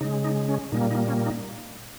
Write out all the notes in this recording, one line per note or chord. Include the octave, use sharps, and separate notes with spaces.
C#3 G#3 D#4
D#4
C#4
A#2 G3 A#3 D#4
D#4
C#4
D#4